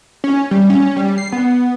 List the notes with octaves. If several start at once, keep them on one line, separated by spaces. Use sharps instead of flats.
C#4
G3
C#4
G3
C7
B3